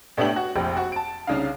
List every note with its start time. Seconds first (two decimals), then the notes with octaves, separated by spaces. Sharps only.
0.17 A2 A3 B3 D4 G4 F#7
0.36 F#4
0.55 F1 A#1 G4
0.77 F#4
0.92 A5 D7
1.27 C2 C#3 D4 D#4 F5